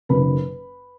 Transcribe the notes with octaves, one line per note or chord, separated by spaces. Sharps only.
F#1 F#2 D#3 B4 B5